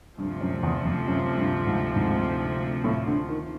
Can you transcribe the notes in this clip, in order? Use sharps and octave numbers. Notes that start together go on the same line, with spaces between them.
D2 G2 C3 F3
F#2
E2
F2
F#2
G2
G#2
G#2
A2
D3
D#3